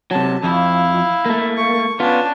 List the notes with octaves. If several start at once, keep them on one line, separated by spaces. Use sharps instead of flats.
C3 F#3 A5
F2 E4 F5
A3 A#3
C#6
B3 C#4 D4 F4